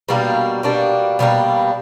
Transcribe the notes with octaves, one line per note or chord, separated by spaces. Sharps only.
B2 G3 A#3 D4
B2 G3 A#3 D4
B2 G3 A#3 D4